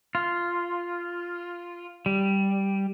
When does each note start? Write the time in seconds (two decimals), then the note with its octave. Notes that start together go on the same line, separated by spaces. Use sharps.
0.15 F4
2.06 G3